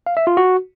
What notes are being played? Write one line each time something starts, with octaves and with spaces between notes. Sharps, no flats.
F5
E5
F4
F#4